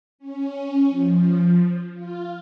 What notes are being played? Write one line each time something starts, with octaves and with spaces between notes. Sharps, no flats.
C#4
F3
F4